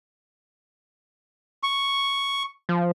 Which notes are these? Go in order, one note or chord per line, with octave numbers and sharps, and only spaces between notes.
C#6
F3